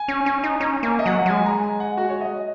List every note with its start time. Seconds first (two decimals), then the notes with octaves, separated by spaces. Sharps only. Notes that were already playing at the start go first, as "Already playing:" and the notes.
Already playing: G#5
0.08 C#4
0.26 C#4
0.44 D#4
0.60 C#4 A#5
0.83 A#3 G#5
0.99 D#5
1.06 F#3 F#5
1.26 F#3
1.30 G#3 G#5
1.46 A#5
1.63 G#5
1.80 F#5
1.98 F#4
2.10 C#5
2.21 D#5